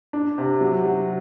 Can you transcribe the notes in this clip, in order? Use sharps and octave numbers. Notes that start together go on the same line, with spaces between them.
D4
C3
F#3
F#3